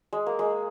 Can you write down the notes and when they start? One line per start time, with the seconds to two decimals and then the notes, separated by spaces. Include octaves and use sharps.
0.13 G#3
0.26 A#3
0.39 G#3